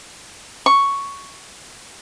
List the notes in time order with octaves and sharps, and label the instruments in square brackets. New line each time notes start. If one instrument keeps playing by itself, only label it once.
[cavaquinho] C#6